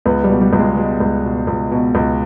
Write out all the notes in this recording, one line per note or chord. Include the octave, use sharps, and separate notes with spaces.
C#2 B3
G3
B2
G3
C#2
G#3
B2 G#3
C#2
B2
C#2
B2
C#2